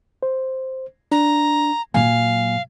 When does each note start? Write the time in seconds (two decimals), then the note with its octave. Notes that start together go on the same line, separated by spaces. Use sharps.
0.23 C5
1.12 D4 A#5
1.94 A#2 F#3 F5 G#5